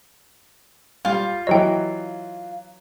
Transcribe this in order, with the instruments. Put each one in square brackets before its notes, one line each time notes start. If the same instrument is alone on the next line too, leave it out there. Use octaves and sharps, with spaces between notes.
[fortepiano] G3 F6 [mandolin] F4
[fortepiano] E3 F#3 C#5 [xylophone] D#5 G5